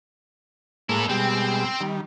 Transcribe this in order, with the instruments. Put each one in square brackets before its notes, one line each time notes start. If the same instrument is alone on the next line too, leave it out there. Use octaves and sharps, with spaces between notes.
[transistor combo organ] A2 G#3 A#3 [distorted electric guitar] E4 A4
[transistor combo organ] B2 G3 G#3 [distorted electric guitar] C4
[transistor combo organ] D#3 G3